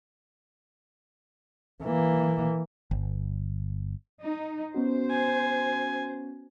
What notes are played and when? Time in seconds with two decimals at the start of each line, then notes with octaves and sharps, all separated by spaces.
1.83 E3 A#3
2.91 G1
4.23 D#4
4.74 B3 C#4 F#4 C5
5.11 G#5